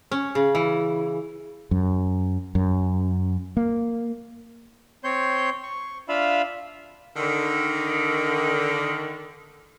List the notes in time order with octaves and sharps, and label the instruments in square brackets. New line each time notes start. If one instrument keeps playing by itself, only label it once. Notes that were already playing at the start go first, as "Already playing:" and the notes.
[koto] C#4
C#3
E3
[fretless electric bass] F#2
F#2
A#3
[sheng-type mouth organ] C4 C#5 C6 G6
C#6
D4 F4 E5 F5 B5
[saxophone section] D3 D#3